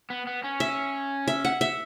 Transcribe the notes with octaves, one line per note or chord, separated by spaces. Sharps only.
B3
B3
C#4
E5
E5
F#5
E5